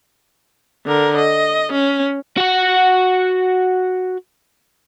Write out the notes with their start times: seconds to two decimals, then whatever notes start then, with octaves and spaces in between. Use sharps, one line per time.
0.86 D3 A#4
1.17 D#5
1.72 C#4
2.37 F#4 F#5